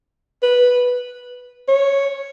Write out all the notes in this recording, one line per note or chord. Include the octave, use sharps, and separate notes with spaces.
B4
C#5